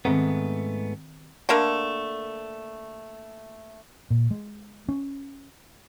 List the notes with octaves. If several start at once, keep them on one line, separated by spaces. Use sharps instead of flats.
G#2 D#3 A3 B3 C4
D3 A3 A#3 A#4
A#2
G#3
C#4